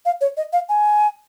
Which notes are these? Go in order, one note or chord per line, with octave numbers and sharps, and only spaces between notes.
F5
C#5
D#5
F5
G#5